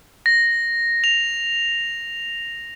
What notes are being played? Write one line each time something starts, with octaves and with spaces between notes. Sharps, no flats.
A#6
F7